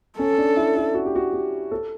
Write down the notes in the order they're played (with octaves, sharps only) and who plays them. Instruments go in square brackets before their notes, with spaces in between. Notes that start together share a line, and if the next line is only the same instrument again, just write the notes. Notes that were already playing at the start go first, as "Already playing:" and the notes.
[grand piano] C#4 [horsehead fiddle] A4
[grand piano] D4
E4
E4
F#4
G4
F#4
G4
A4